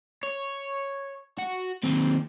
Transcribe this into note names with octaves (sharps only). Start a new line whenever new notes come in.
C#5
F#4
D#2 C4